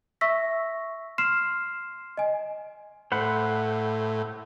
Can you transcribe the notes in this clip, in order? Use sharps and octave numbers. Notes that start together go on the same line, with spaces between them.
E5 C#6 E6 A#6 B6
C6 F6 C7 E7
D#5 G#5
A2 C5 F#5 B5